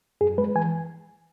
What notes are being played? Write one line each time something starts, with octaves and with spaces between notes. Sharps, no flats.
F#2 G#4
G#3 B4
E3 G#5